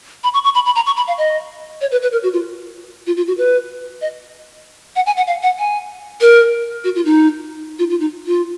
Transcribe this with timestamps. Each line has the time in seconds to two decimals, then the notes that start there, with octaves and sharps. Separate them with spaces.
0.24 B5
0.34 C#6
0.44 C#6
0.55 B5
0.66 B5
0.75 A#5
0.86 C#6
0.97 B5
1.08 F5
1.18 D#5
1.81 C#5
1.92 B4
2.02 B4
2.12 A#4
2.23 F#4
2.33 F4
3.07 F4
3.17 F4
3.27 F#4
3.38 B4
4.01 D#5
4.96 F#5
5.06 G#5
5.17 F#5
5.27 F5
5.43 F#5
5.59 G#5
6.21 A#4
6.84 F#4
6.96 F4
7.05 D#4
7.79 F4
7.90 F4
8.00 D#4
8.27 F4